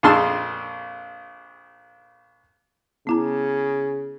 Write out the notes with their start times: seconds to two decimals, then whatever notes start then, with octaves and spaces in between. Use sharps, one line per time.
0.03 A#1 F2 G#4 A5 C6 E6
3.07 C#3 B3 E4 A#5